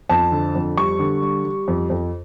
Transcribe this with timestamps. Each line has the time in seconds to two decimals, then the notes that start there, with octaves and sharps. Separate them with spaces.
0.10 F2 A5
0.31 D3
0.55 F2
0.77 G3 C#6
0.99 D3
1.22 G3
1.45 G3
1.68 F2
1.90 F2